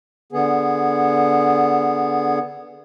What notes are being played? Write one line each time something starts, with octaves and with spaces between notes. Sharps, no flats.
D3 B3 G#4